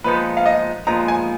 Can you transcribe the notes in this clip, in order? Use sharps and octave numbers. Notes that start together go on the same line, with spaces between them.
A#2 F3 G#3 B3 D#4 B4
F5
D#5
A#2 F3 G#3 B3 D#4 A#5
G#5